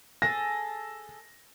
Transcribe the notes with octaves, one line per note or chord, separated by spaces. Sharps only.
G#4 A4 A#6